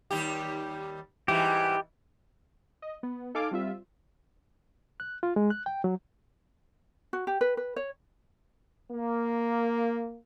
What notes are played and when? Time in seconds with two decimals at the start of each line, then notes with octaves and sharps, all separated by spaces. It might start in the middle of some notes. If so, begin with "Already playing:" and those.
0.11 D#2 G3 G4
1.28 G#2 E3 G3 G4
2.82 D#5
3.03 B3
3.34 D#4 A4 F5 G#5 D6
3.51 G3 C4 F4 E5
5.00 F#6
5.23 F4
5.36 G#3
5.50 F#6
5.66 G5
5.84 F#3
7.13 F#4
7.27 G4
7.41 B4
7.57 B4
7.76 C#5
8.91 A#3